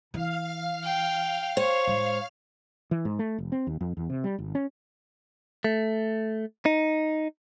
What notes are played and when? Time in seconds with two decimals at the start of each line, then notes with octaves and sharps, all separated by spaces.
0.14 E3 F5 F6
0.84 G5
1.57 C5 C#5
1.87 A2 G#3
2.91 E3
3.05 G#2
3.19 A3
3.38 F1
3.52 C4
3.67 D#2
3.81 F2
3.97 E2
4.10 C3
4.24 G3
4.39 G#1
4.55 C#4
5.64 A3
6.66 D#4